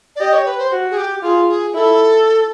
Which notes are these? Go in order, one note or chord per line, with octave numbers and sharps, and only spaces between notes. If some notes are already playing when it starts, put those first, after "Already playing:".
D5
G4 D#5
C#5
B4
C5
F#4
G#4
G4
F4 G#4
G#4
E4 A4